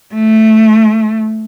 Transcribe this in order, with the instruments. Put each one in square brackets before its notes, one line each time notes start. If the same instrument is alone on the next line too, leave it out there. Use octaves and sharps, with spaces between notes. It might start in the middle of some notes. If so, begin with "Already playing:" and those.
[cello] A3